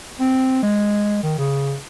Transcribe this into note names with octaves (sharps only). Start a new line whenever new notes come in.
C4
G#3
D#3
C#3